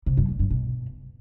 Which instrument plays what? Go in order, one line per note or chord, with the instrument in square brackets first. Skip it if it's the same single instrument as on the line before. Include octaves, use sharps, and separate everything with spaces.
[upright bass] C3
F#2
A#2
G2
B2